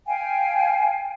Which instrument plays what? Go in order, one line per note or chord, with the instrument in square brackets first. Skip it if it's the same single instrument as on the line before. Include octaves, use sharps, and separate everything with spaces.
[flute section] F5 G5 G#5